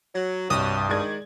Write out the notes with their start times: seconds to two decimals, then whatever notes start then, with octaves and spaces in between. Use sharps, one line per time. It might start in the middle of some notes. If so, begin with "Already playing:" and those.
0.15 F#3
0.50 C2 G2 F#4 C#5 D#5 D#6
0.89 D#3 G#3 D5 G#6